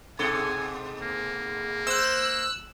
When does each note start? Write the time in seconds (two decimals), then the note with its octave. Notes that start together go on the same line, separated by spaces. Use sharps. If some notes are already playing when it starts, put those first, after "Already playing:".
0.19 G#2 B2 A4 G#5
1.02 A#3
1.87 C5 E6 F#6